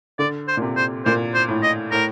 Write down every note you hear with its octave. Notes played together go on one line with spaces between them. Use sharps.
D3 D5
C5
A#2
C3
C5
A#2 C5
C5
A2
D#5
A2 A#4